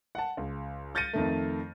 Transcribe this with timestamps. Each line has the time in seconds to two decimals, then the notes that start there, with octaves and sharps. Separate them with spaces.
0.15 F#5 A5
0.37 C#2
0.95 F6 G6 A6 A#6 C#7 D#7
1.13 F2 D#3 A3